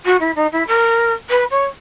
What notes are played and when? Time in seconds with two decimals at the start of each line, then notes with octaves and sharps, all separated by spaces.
0.05 F#4
0.20 E4
0.36 D#4
0.52 E4
0.67 A#4
1.30 B4
1.51 C#5